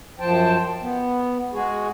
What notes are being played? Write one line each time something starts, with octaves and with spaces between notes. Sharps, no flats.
F#2 F3 C5 G5 A5
B3
G#3 F#4 G#4